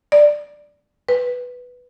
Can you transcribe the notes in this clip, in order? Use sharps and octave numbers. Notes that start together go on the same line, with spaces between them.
D5
B4